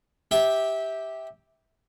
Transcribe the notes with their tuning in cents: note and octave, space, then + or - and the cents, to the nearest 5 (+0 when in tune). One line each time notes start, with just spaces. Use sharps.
G4 +0 E5 -20